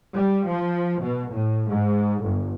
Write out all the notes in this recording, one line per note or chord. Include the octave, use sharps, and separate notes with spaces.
G3
F3
B2
A2
G#2
G1